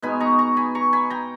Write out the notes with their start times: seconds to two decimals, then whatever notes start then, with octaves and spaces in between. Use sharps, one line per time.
0.02 B2 G#3 B3 D#4 G#5 B5
0.20 A#5 C#6
0.39 A#5 C#6
0.57 G#5 B5
0.75 A#5 C#6
0.93 G#5 B5
1.10 G5 A#5